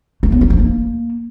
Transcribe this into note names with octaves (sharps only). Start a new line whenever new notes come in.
A3
B3
F#3
F3
A#3